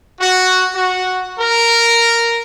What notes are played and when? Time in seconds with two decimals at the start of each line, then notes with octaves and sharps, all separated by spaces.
0.20 F#4
0.75 F#4
1.40 A#4